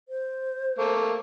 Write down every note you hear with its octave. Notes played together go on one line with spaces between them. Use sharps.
C5
A3 A#3